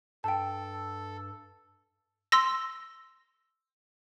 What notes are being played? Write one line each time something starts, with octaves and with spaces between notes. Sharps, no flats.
G2 A4 G5 A5
C6 E6 A#6